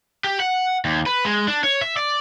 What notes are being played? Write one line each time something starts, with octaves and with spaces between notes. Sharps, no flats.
G4
F#5
D#2
B4
G#3
D4
C#5
E5
D5